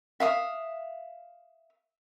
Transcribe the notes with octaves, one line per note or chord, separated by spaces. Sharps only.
E5 F5 D#6